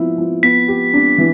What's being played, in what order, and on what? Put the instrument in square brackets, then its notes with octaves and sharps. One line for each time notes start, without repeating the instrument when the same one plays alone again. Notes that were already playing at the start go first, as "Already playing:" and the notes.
Already playing: [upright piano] F3 B3 E4
F3
[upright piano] B3 [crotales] B6
[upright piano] G4
D4
E3